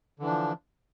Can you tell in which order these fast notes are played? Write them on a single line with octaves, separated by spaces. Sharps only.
D3 E3 D4 F3